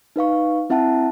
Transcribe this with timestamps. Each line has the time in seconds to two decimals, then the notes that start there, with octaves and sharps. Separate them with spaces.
0.16 D#4 B4 F5 C#6
0.70 C4 E4 E5 F#5 A5